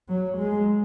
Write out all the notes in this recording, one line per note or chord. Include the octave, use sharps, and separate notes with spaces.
F#3
G#3